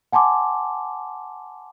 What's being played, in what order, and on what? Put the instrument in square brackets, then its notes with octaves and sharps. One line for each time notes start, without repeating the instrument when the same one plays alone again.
[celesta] F#5 G#5 A5 C6 D6